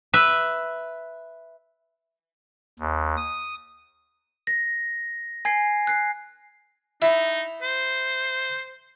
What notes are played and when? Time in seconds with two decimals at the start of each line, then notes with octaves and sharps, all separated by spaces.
0.14 B4 E5
2.80 D#2
3.17 D#6
4.47 A#6
5.45 G#5 G#6 C7
5.87 F#6 C7
7.02 D#4 E4
7.62 C5